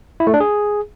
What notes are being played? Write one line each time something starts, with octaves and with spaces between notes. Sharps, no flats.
E4
A3
D4
G#4